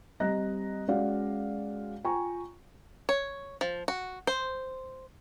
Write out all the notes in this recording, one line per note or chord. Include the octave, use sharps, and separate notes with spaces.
G3 C4 D#5 A#5 F#6 A#6
G#3 C#4 F#4 D5 F5 F#5
F4 G5 G#5 A#5 C#6
C#5
F3
F#4
C5